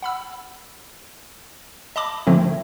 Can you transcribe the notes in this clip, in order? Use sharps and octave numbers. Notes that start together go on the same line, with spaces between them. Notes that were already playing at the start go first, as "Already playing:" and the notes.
F#5 B5 E6
D#5 A5 B5 D6
D3 F3 A3 C4